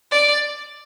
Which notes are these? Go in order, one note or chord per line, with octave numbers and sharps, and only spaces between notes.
D5